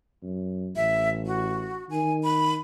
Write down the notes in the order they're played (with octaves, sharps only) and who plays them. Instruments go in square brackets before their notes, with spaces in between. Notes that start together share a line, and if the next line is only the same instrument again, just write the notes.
[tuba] F#2
[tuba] A1 [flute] E5
[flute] F#4
[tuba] D#3 [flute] G#5
[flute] B5